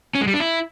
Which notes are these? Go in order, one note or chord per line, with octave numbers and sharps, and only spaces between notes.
C#4
G#3
G3
D4
E4